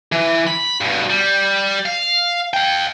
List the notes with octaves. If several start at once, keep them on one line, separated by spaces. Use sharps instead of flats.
E3
B5
G2 B2
G3
F5
F5 G5